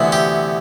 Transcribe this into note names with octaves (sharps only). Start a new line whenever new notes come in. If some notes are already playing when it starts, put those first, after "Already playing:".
Already playing: D2 C3 E3 B3
G4